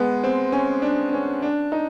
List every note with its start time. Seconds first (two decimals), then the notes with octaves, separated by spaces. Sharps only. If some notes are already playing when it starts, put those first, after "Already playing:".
Already playing: G#3 B3
0.24 C4
0.52 C#4
0.82 D4
1.13 C#4
1.42 D4
1.72 D#4